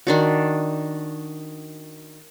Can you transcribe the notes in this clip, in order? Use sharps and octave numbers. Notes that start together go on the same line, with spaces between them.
D#3 D4 F#4